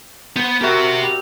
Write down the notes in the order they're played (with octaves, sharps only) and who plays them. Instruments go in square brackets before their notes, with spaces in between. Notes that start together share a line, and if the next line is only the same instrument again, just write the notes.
[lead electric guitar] B3 [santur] C5 B5
[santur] C4 F#4 A#4 [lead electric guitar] G4 E5
[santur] G3